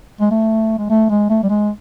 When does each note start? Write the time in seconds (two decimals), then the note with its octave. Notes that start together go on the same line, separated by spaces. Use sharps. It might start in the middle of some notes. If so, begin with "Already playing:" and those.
0.21 G#3
0.31 A3
0.78 G#3
0.90 A3
1.09 G#3
1.30 A3
1.43 G3
1.49 G#3